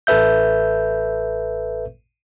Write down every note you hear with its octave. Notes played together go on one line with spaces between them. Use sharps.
A1 A4 B4 E5 G6